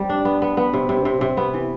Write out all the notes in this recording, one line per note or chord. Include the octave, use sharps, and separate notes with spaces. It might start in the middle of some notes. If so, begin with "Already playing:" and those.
Already playing: G3 C4
D4
B3
B3
B3
C3
C3
C3
C3
B3
E3